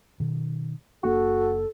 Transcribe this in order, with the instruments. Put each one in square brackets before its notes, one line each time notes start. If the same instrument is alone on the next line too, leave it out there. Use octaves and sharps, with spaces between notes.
[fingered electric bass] B2 D#3
[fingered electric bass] F#1 A#3 D4 [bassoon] F#4 [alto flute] A4